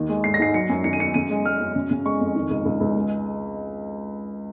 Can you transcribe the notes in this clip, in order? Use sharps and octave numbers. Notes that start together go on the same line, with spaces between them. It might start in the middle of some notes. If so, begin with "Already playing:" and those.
Already playing: D#2 D#3
G#3
G#2 C7
A#6
G#2 C7
F#3 C#7
F#2
D#3 C#7
D#7
F#2 C#7
C#3 D#7
G#3
G#3 F6
F#2
C#3
C#3
G#3 C#6
F2
D#3
C#2
C#2
C#2
G#3